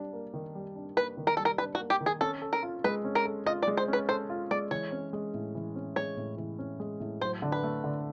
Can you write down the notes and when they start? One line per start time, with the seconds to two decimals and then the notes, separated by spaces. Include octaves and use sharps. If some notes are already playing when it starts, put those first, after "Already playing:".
Already playing: G3 D4
0.13 A#3
0.34 D#3
0.55 G3
0.76 D4
0.97 A#3 B4
1.17 D#3
1.27 A#4
1.37 G3 A4
1.45 A#4
1.58 D4 B4
1.75 F#4
1.80 A#3
1.90 G4
2.01 D#3
2.06 G#4
2.21 C#4 A4
2.42 A4
2.53 A#4
2.63 F4
2.84 G#3 B4
3.05 C#4
3.15 A#4
3.25 A4
3.46 F4 D#5
3.62 D5
3.67 G#3
3.77 C5
3.88 C#4 B4
4.09 A4 C5
4.29 F4
4.51 G#3 D5
4.71 E3 C#5
4.92 C#4
5.13 G#3
5.34 A2
5.55 E3
5.76 C#4
5.96 G#3 C#5
6.17 A2
6.38 E3
6.59 C#4
6.80 G#3
7.00 A2
7.21 F#3 C5
7.42 D3
7.52 B4
7.63 A3
7.84 D3